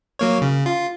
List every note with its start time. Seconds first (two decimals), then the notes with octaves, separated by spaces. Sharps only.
0.19 F#3 A#3 C#5
0.42 C#3
0.66 F4